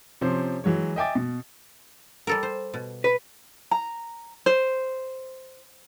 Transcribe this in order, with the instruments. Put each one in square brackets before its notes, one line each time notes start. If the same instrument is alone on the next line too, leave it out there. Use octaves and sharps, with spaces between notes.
[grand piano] C3 F3 C#4 C5
E3 F#3 G#3 C#5
D#5 E5 G5 G#5 D6 A6
B2
[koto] G3 A4 A#4
C5
B2
[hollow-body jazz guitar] B4
[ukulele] A#5
C5